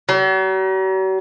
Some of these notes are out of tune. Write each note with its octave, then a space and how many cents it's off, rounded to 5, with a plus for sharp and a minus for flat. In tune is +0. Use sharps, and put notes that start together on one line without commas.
F#3 +45